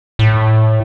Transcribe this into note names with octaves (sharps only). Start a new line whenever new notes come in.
A2